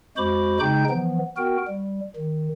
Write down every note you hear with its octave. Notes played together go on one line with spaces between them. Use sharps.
F2 G#3 F#4 C5 B5 D6
C#3 G#3 D#4 G5 G6
E3 F3 B3
B3 F#4 A#4 G5
G3
D#3